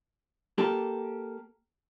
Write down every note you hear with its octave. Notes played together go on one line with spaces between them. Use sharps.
A#3 G4 A4